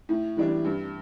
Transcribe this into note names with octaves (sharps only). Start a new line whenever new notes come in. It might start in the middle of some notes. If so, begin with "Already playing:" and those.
A2
E3 G3 D4
G2